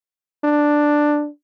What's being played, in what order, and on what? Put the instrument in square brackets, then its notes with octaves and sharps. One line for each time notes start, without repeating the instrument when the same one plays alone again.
[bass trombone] D4